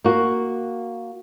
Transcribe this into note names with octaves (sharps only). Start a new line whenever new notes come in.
A#3 F#4